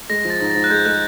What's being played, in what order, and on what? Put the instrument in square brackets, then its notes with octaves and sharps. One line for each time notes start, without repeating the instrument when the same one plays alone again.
[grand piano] G#3 [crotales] A#6
[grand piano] F3
[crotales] A6
[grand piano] G#2
[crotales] A6
[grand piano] G#2
[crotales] F#6
[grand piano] G#3 [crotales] G6
[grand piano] G#3 [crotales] F#6